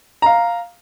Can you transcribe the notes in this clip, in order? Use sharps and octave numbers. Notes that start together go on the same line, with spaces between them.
F5 A#5